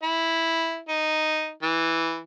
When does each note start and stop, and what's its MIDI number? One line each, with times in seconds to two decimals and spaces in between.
0.03 0.79 64
0.88 1.51 63
1.62 2.19 52